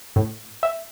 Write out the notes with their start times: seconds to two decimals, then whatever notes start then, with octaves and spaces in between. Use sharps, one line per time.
0.16 A2
0.63 E5